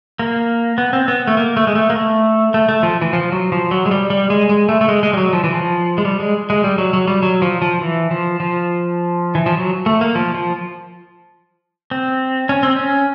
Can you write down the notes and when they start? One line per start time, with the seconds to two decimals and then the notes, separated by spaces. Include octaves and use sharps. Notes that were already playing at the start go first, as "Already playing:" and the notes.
0.19 A#3
0.78 B3
0.93 C4
1.08 B3
1.28 A3
1.37 A#3
1.57 A3
1.67 G#3
1.75 A3
1.90 A#3
1.96 A3
2.54 A3
2.69 A3
2.83 F3
3.01 E3
3.13 F3
3.32 F#3
3.52 F3
3.71 F#3
3.86 G#3
3.91 G3
4.10 G3
4.30 G#3
4.49 G#3
4.69 A3
4.81 A3
4.88 G#3
5.03 G#3
5.13 G3
5.17 F#3
5.33 F3
5.44 E3
5.54 F3
5.98 G#3
6.05 G3
6.20 G#3
6.50 G#3
6.64 G3
6.78 F#3
6.93 F#3
7.08 G3
7.23 F#3
7.42 F3
7.62 F3
7.81 E3
8.11 F3
8.40 F3
9.35 E3
9.46 F3
9.57 F#3
9.86 A3
10.01 A#3
10.15 F3
10.34 F3
11.91 C4
12.49 C#4
12.63 C4
12.76 C#4